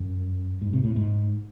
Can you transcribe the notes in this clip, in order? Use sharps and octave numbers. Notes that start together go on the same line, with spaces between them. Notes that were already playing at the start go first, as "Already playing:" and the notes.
Already playing: F#2
G#2
C3
A2
G#2